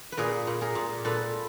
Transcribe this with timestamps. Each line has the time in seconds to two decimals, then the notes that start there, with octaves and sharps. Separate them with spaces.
0.12 B4
0.17 A#2 G#4 A#4
0.47 A#2
0.61 G#4 A#4
0.75 A#2
1.04 A#2 A4 B4